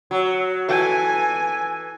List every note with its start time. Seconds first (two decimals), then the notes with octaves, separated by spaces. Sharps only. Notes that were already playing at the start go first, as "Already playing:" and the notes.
0.11 F#3
0.68 E3 A4 G#5